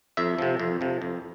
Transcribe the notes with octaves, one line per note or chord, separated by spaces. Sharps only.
F2 E5
C3 F3
F2
C3 F3
F2